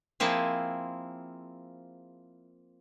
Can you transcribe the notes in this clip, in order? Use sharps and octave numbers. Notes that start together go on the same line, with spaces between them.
F3 A#3 C4 E4 G#4